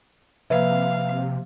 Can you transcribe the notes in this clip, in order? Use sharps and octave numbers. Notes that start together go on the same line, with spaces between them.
C3 F3 A#3 B4 E5 F5